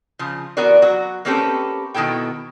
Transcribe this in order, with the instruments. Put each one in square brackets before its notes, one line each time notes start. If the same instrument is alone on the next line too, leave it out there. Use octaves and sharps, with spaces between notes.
[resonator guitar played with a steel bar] C#3 F3
E3 B3 F#4 A#4 D5
F#3 F#4
A#3 C4 C#4 G4 A4 B4
B2 D#3 A3 E4 A4 G5